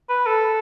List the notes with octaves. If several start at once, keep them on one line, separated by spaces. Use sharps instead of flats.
B4
A4